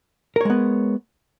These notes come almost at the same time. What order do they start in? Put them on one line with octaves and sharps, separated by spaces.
A#4 C#5 G#3 B3